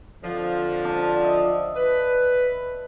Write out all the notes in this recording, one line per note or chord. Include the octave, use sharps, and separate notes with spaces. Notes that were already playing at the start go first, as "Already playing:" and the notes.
F2 D3 F3
D4
D#5 E5
B4